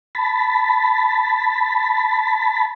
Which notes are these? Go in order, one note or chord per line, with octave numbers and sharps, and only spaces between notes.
A5 B5